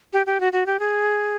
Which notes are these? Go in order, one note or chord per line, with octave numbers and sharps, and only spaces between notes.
G4
G4
F#4
F#4
G4
G#4